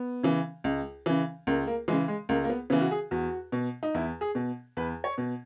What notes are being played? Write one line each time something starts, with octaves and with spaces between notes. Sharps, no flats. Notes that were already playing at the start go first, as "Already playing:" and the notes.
Already playing: B3
C#3 E3
C#2
C#3 E3
C#2 A#3
A#3
C#3 E3 G#3
G#3
C#2 A#3
A#3
B3
C#3 E3 B3
F#4
G#4
E2 F#4
B2
D#4
E2 E4
G#4
B2
E2 B4
C#5
B2